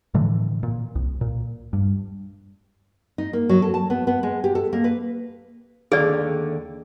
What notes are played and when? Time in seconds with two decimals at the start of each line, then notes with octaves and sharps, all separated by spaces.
0.14 A2 D3 E3 F3
0.63 A#2
0.95 C2
1.21 A#2
1.73 G2
3.18 D#4
3.33 A#3
3.49 F#3
3.62 A4
3.74 A5
3.90 B3
4.07 B3
4.23 G#3
4.44 G4
4.55 A4
4.73 A#3
4.84 B4
5.92 D#2 D3 G#4 D5 F5